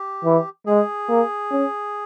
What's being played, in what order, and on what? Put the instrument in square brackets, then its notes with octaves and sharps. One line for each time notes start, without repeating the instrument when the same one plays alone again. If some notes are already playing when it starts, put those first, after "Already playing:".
Already playing: [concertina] G4
[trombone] E3
[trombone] G#3 [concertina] G#4
[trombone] A#3
C#4